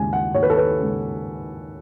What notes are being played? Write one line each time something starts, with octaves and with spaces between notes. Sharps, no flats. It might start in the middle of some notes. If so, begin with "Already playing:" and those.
Already playing: D#2 C#3 G#3 G#5
F#5
D#2 C#5
B4
A4
B4
C#3 G#3